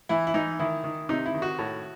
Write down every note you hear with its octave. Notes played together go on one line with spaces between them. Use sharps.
E3 E4
E4
E3 D#4
D#3 E4
D#3
C3 D#4
E4
D#3
F#4
A2